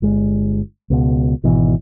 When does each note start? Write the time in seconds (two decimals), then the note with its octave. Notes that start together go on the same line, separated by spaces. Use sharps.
0.02 G1 G#3
0.90 C#2 B2
1.44 G#1 B2 E3